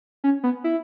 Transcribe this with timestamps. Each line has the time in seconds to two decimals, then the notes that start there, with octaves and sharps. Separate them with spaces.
0.24 C#4
0.43 B3
0.64 E4